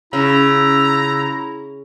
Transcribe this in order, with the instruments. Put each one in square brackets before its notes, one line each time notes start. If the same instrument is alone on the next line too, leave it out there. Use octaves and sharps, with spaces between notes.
[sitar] C#3 [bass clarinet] E4 [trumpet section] F4 A#5 [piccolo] E6